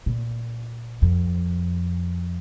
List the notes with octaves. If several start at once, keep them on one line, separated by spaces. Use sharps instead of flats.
A#2
F2